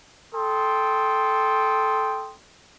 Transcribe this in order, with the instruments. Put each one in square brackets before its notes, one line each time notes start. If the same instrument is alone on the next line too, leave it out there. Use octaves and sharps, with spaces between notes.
[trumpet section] A4 G5 C6 D#6